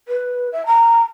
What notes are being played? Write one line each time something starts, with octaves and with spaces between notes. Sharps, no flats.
B4
E5
A#5